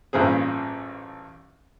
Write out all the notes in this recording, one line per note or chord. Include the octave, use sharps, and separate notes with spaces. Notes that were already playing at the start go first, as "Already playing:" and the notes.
A1 G2 A#2 C4 G#4